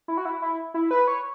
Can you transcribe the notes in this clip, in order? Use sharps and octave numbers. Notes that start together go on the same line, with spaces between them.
E4
F#4
E4
E4
E4
B4
C#5